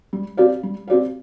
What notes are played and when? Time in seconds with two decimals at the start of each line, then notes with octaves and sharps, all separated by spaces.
0.13 G3
0.37 C4 G4 D5 F5
0.63 G3
0.88 C4 G4 D5 F5